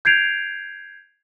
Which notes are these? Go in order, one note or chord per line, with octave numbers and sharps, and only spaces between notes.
G6 G#6 C7 D7 F7